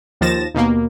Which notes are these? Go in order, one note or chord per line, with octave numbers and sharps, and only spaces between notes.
D#2 F3 A6 A#6 E7
D#2 B2 A#3